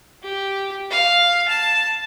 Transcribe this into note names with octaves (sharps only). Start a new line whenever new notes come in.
G4
F5
A5